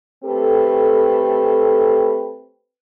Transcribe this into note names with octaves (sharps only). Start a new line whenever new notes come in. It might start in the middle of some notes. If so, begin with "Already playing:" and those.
A3 C4 G4 A4 B4